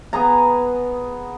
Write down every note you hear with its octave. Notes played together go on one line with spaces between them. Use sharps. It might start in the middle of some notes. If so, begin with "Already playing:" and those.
B3 G#4 A#5